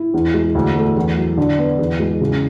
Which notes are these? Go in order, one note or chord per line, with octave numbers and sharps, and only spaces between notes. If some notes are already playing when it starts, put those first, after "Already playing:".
Already playing: E4
E2
G#3
D2
A3
E2
F#3
D3
B3
E2
G#3
C#3